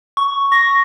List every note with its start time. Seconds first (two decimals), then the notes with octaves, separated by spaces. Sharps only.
0.17 C#6
0.52 C#6 A#6